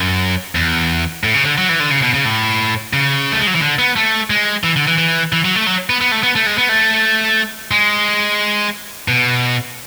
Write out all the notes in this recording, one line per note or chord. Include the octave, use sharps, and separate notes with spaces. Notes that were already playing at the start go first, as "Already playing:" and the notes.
Already playing: F#2
E2
A2
C#3
D3
F#3
E3
D3
C#3
B2
C#3
A2
C#3
A3
G#3
F#3
E3
D3
B3
A3
G#3
E3
D3
E3
E3
E3
F#3
A3
F#3
B3
B3
A3
B3
A3
G#3
B3
A3
G#3
B2